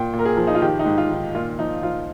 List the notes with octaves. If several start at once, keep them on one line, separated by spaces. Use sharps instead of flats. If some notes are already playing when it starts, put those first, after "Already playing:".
Already playing: A#2 G5
A#2
A#4
G#4
F3
D#4
F4
D#3 G4
D#4
G#2
F4
D#3
A#2 F4
F3 D#4
F3 F4